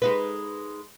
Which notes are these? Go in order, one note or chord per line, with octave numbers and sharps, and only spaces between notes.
G#3 D#4 B4